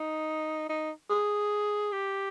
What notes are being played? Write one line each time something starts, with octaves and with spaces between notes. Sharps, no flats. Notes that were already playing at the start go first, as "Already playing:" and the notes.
Already playing: D#4
D#4
G#4
G4